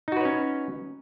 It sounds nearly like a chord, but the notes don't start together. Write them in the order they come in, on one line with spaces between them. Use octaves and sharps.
D#4 F#4 B4 C#5 C#4